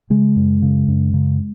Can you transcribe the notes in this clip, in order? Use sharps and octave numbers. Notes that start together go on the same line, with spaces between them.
C#3 G#3
F#2
C#3
F#2
C#3